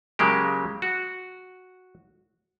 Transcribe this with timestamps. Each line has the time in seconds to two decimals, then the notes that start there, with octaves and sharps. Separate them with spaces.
0.19 C#3 F#3 G#3 A#3 G4
0.82 F#4